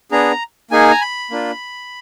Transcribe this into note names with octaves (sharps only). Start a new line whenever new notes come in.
B3 D4 G#4 A#5
A#3 D#4 G#4 G#5
A#5
B5
A#3 D4 F4